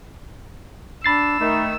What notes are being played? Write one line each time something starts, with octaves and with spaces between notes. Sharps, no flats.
D4 B5 E6 A6 C7
D#3 A3 D#4